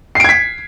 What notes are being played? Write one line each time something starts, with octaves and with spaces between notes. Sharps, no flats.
G#6 B6 C7 D7